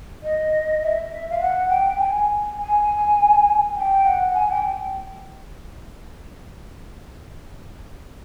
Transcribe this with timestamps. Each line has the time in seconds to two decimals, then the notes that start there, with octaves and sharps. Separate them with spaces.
0.23 D#5
0.82 E5
1.30 F5
1.40 F#5
1.69 G5
1.88 G5
1.99 G#5
2.58 G#5
3.75 G5
4.05 F#5
4.34 G#5
4.49 G5